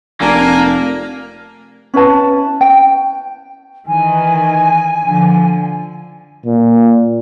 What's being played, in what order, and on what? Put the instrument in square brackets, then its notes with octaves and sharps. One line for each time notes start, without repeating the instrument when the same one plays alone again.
[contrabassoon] F1 [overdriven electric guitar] A#3 [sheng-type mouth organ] D4 A#4 G#5
[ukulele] C#4 E4 B4 A5
G5
[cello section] D#3 E3 [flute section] G#5
[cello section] D3 F3
[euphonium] A#2